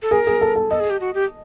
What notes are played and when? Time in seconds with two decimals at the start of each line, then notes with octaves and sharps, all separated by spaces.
0.02 A4
0.11 G#4 A#4
0.27 G#4
0.41 A4
0.56 A4
0.70 A4 D#5
0.80 G#4
0.90 G4
1.00 F#4
1.14 G4